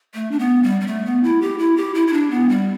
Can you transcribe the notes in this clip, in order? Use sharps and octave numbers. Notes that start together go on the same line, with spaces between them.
A3
D4
B3
G3
G3
A3
B3
E4
G4
E4
G4
E4
E4
D4
B3
G3